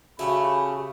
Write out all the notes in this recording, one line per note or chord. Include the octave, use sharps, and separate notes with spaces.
C#3 A3 F#4 G4 F#5 B5